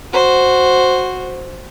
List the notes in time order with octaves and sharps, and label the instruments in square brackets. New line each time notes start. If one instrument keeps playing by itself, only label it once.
[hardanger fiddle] F#4 C5